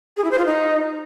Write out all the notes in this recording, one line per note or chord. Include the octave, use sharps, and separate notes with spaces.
G#4
E4
C5
F4
D#4